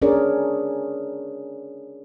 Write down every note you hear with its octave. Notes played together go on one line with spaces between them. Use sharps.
C#4 D4 G#4 A#4 C#5 D5